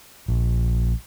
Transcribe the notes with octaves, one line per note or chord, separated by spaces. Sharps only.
A#1